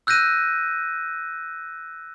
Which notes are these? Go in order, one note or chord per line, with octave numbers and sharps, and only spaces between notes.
E6 F#6 G6 A#6 D#7